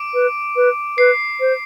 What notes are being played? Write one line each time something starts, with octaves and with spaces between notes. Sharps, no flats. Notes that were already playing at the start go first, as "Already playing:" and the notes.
Already playing: D6 D7
B4
B4
B4 C7
C5